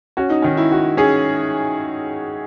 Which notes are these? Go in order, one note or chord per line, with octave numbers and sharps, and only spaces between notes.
C#4 F#4
D#4
D#3 C#4
E4
F#4
C#4 G#4